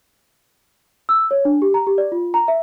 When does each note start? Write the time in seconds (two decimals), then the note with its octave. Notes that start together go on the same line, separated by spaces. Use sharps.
1.09 E6
1.31 C#5
1.45 D4
1.62 G4
1.74 A#5
1.87 G4
1.98 D5
2.12 F4
2.34 A#5
2.48 E5